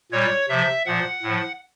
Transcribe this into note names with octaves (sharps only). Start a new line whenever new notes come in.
A#2 G3 C#5
C3 F3 E5
A#2 F3 F#5
A2 F3